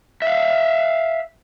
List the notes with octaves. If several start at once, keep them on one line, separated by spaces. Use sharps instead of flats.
E5 F5